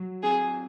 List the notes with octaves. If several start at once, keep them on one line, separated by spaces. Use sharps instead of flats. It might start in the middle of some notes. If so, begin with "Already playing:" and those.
Already playing: F#3
C4 G#4